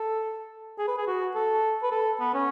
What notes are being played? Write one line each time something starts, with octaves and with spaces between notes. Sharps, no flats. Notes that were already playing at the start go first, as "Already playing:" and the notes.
Already playing: A4
G#4
B4
G#4
F#4
A4
B4
A4
B3
C#4